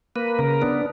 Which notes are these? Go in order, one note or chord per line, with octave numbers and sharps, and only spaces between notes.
A#3 B4
C#3 A#4
B3 D4